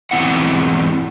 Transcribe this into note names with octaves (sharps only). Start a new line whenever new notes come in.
E2 G#2 B2 C4 E4 F#5